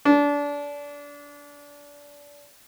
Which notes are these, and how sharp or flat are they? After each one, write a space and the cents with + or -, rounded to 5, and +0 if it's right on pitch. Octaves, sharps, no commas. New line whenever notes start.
D4 -25